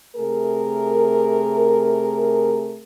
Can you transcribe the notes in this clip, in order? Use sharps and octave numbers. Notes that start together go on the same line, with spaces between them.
C3 A3 G#4 A#4